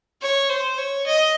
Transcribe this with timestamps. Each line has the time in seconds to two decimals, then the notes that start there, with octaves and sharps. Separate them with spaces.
0.21 C#5
0.49 C5
0.78 C#5
1.06 D#5